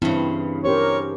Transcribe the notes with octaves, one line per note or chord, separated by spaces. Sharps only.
G2 C#3 E3 C4 E4
C#4 G4 A#4 C5 C#5